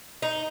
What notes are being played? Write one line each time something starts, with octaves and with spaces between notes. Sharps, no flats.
D#4